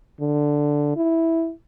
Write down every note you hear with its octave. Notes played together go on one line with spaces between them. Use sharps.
D3
E4